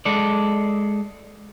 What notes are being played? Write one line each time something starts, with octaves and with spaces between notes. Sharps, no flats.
G#3 A4 D5